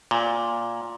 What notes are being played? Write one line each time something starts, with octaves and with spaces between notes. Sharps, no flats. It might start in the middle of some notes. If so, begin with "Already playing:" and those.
A#2